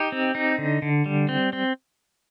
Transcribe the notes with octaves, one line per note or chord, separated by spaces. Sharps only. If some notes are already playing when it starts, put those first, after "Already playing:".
Already playing: D#4 G4
C4
D#4
D3
D3
G3
C4
C4